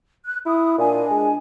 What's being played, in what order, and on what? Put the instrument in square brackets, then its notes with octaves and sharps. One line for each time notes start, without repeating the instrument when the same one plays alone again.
[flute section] F#6
[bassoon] E4 [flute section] D#6
[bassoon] A#2 [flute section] D4 D#5 G#5
[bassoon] G#3